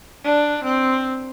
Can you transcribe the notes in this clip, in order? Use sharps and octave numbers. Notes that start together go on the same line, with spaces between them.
D4
C4